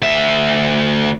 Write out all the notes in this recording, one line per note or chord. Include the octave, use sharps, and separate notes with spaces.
D2 E5